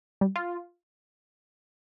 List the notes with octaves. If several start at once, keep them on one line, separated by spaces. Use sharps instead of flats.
G3
F4